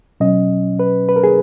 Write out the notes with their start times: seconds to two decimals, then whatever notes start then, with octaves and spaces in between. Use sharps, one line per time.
0.20 B2 F#3 C#4 D#5
0.79 B4
1.09 B4
1.16 A#4
1.24 G#4